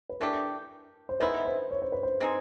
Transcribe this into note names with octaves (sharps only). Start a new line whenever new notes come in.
B4
E3 A3 D4 G4 A#4
C5
D#3 G#3 B3 E4 B4
C5
C#5
C5
B4
C5
G#3 C4 D#4 G#4